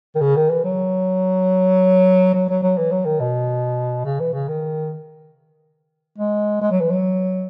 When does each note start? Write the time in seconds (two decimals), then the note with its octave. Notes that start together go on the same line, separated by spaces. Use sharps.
0.15 D#3
0.21 C#3
0.36 D#3
0.50 E3
0.64 F#3
2.34 F#3
2.49 F#3
2.62 F#3
2.77 E3
2.91 F#3
3.05 D#3
3.20 B2
4.05 C#3
4.20 E3
4.34 C#3
4.48 D#3
6.18 G#3
6.61 G#3
6.71 F#3
6.80 E3
6.90 F#3